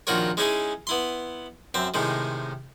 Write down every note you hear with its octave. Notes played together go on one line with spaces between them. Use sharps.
A#1 D#3 F4 F#4 A#4 C#5
G#3 C#4 D#4 E4 G#4
B3 E4 C6
F#2 C4 E5
A2 C3 D#3 G#3